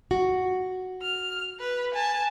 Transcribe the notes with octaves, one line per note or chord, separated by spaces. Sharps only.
F#4
F6
B4
G#5 A5